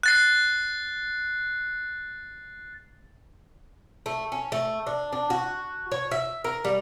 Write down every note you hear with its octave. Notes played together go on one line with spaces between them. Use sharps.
F#6 A6 C7
A3
C#4
A3
D4
D4
F#4
C#5
E5
A#4
G3